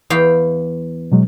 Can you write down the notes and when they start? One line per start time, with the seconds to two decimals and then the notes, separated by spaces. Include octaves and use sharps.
0.10 E2 F5 G5
1.12 B2 F#3 G#3